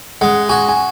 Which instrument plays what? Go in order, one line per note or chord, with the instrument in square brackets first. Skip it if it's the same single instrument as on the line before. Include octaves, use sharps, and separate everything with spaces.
[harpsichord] G#3 [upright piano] F#5
[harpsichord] F#4 [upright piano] G#5
[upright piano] G#5